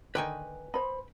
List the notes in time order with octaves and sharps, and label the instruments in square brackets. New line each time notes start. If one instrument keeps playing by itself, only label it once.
[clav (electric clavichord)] D3 D#3 D#4 [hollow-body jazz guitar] B4 G5 G#5
[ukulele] C5 B5 [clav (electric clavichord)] D#5